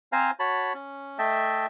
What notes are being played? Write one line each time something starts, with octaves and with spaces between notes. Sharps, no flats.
C4 C5 F5 G#5 A#5
F#4 C#5 A5 B5
C#4
A3 D#5 E5 G5 A5